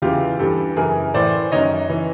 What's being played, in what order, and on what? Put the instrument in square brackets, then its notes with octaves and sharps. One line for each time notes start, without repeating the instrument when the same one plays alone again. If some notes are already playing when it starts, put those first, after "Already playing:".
[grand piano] E2 C#3 E3 F4 G4
G2 E3 G4 A4
F#2 C#3 E3 G#4 A#4
A2 E3 C5 D5
F#2 D#3 C#5 D#5
E3